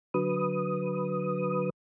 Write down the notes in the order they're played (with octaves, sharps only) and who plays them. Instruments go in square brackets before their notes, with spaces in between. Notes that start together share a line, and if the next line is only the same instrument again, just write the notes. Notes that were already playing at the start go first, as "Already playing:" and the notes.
[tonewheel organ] D3 F#3 B4 D#6